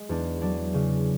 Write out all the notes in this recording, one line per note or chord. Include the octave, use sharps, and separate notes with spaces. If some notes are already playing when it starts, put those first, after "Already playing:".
Already playing: G#3
E2 D4
F#3 D4
C#3